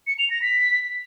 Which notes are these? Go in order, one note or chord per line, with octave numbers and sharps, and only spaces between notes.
C#7
F7
A#6
B6